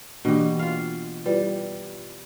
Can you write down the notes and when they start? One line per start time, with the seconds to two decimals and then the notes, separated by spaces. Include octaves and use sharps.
0.25 B2 E3 A#3 D4 G4
0.59 F4 F5
1.26 G3 E4 F4 B4